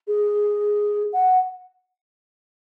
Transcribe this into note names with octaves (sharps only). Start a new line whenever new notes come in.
G#4
F#5